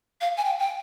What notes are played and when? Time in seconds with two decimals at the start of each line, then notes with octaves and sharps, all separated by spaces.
0.21 F5
0.37 G#5
0.45 G5
0.59 G5